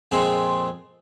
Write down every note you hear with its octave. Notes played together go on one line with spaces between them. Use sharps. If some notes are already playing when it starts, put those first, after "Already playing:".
F2 A#2 G#3 C4 G#4 C6